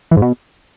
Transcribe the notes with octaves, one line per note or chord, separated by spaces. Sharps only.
E3
G#2
B2